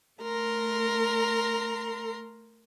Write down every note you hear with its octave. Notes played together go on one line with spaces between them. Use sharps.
A3 A#4 A#5 C6